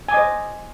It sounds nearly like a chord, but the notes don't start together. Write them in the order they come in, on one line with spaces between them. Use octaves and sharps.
G#5 D6 D#5 C5